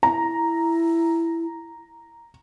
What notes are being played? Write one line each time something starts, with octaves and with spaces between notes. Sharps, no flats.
E4 A#5